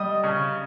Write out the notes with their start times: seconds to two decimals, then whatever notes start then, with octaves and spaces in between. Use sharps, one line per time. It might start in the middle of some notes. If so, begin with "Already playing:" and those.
Already playing: G3 D#5 D#6
0.23 C#3